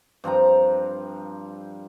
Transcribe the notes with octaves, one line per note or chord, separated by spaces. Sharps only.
G2 F3 C4 A#5